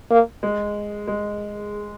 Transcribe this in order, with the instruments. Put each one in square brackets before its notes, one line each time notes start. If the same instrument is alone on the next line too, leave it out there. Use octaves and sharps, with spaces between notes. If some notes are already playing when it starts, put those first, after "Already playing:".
[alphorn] A#3
[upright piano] G#3
G#3